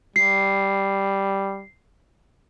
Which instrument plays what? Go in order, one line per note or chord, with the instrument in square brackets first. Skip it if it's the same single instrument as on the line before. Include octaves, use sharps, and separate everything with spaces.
[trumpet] G3 [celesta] C7